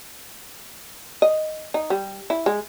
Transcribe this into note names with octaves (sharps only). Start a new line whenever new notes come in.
D#5
D#4
G3
E4
G#3